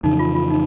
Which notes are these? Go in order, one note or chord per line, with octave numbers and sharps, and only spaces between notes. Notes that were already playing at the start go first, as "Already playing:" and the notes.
F2 C#3 E3 D#4
F4
F4
D#4